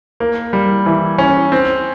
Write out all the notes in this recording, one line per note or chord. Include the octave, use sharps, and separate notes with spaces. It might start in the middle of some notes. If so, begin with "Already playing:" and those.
A#3
G3
E3
C#4
C4